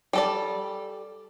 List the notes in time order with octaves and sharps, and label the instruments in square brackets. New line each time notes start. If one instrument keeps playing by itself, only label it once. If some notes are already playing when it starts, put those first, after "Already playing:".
[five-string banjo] G3 A4 D5